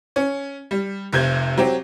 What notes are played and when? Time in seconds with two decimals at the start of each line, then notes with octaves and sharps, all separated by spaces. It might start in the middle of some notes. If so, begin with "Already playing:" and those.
0.16 C#4
0.71 G3
1.13 F1 C3 G6 G#6
1.58 F#3 C4 G4